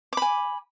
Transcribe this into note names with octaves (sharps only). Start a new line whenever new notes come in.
G#5 B5 D6